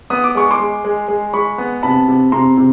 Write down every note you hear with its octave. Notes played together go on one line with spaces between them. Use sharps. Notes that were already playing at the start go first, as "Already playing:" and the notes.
B3 D#6
D6
G#3 C#6
C6 D6
G#3
G#3
G#3
G#3 B5 C#6
B3
C3 A5 B5
C3
C3 A#5 C6
C3